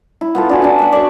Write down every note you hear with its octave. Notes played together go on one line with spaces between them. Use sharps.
E4
B3 F4 A4
D4 F#4 G#4
D4 F#5
E5 F#5
D5 C#6